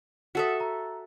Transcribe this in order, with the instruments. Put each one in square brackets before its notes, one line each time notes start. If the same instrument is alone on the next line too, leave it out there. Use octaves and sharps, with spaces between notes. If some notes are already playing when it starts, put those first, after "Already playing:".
[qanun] F#4 A4 E5 [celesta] F#5 D#6
[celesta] A#5